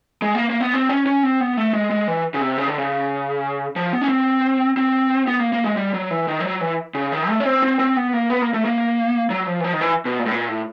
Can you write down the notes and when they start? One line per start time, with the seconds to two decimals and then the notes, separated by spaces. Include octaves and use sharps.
0.22 G#3
0.35 A#3
0.50 A#3
0.61 B3
0.74 C4
0.89 C#4
1.06 C#4
1.23 C4
1.40 B3
1.57 A3
1.73 G#3
1.90 G#3
2.08 E3
2.34 C#3
2.41 C3
2.58 C#3
2.68 D3
2.78 C#3
3.76 F3
3.93 B3
4.01 C#4
4.09 C4
4.77 C4
5.28 B3
5.40 A#3
5.53 A#3
5.64 G#3
5.77 G3
5.94 F#3
6.11 E3
6.28 D#3
6.40 F3
6.45 F#3
6.61 E3
6.95 C#3
7.12 D#3
7.29 A3
7.40 C#4
7.45 C4
7.63 C4
7.79 C4
7.97 B3
8.13 A#3
8.30 B3
8.42 A#3
8.54 A3
8.65 A#3
9.30 F#3
9.47 F3
9.60 E3
9.64 F3
9.73 D#3
9.81 E3
10.05 B2
10.19 A#2
10.26 A2
10.31 A#2
10.48 A2